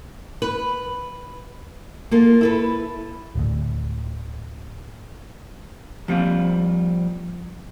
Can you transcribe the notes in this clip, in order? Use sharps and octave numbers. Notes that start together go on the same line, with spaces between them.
B4
A#3 F4 A4
E4 A4 B4
D1 D2
F3 G3 A#3 C4 F4